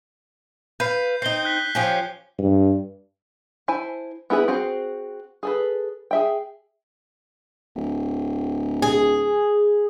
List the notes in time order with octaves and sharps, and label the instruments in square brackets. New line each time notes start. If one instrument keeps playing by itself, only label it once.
[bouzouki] B4 F5 [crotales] G6 C7
[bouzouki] C4 D#4 [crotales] C7 G7
[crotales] F#6 G6 B6
[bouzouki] F3 C#4 G4
[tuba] G2
[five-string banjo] E4 C5 G#5 A5
B3 E4 G#4 A#4 B4
C4 F#4 G#4 C5
G#4 A4 B4
G#4 E5 G5
[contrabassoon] D1
[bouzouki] G#4